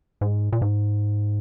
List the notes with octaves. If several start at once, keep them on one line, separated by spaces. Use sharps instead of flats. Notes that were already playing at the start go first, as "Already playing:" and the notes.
G#2
A#2
G#2